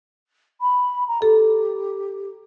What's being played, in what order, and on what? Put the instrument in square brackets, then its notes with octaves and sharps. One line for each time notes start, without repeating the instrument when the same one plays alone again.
[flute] B5
A#5
[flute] G4 [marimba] A4